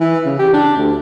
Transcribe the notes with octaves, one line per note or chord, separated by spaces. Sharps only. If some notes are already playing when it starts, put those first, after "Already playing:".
E3
C#3
G4
D4
D2